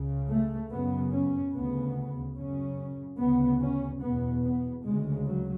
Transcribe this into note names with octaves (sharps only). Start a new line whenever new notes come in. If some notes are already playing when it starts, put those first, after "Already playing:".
Already playing: C#2 C#3
A3
F#2 C#3 B3
C#4
D2 C#3 B3
F#2 C#3 C#4
D2 C#3 B3
C#4
E2 B2 B3
B3
D2 C#3 G#3
F#3